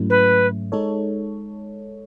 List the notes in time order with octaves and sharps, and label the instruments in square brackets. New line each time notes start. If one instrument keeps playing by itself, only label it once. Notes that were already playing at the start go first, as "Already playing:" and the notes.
Already playing: [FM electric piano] G#2 F#3 A3 C#4 E4
[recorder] B4
[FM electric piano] G#3 D#4 A4 C#5